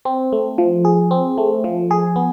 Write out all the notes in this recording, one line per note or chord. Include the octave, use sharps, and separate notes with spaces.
C4
A3
F3
G#4
C4
A3
F3
G#4
B3